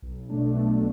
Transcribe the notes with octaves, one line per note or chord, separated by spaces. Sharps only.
B1
B2 A3 D4
B1